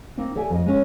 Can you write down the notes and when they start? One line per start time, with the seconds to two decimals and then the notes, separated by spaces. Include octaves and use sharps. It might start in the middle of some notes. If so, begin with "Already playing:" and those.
0.17 A#3 C4 D#4
0.35 G4 A4 D5 E5 G#5
0.50 F2 D#5
0.66 G#3 C#4